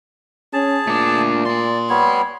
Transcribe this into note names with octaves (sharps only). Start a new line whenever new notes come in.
C#4 G#4 A5
A#2 A3 D4
D5 G#5 C6
G3 B3 C#5